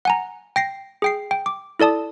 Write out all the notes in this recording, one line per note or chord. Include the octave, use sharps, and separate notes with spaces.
F#5 G#5 A#5
G5 A#6 C7
G#4 G5 C7
G5
D6
E4 A4 D5 A5 D#6